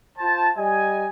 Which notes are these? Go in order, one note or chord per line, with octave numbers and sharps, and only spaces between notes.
F4 C5 A5
G3 D#5 G#5